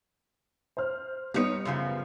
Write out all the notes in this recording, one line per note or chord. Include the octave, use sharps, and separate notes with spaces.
C5 F6
G3 B3 D4 D#4 C#5 C#7
F#2 C#3 F3